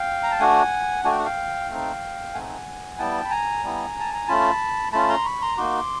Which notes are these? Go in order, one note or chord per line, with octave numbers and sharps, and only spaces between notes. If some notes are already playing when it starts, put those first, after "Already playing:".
Already playing: F5 G5
A#5
A5
A3 D4 F#4 F#5 G#5
A3 D4 F#4 G#5
G5
F#5
F5 G5
A3 C4 D#4
A3 C4 D#4 F#5 G#5
G3 B3 E4 G5 A5
B5
G#5 A#5
G3 B3 E4
A5
A#5
A3 C#4 F4 A5 B5
A3 C#4 F4 A5 B5
A#5 C6
B5 C#6
A#5 C6
A#3 D#4 F#4 C6 D6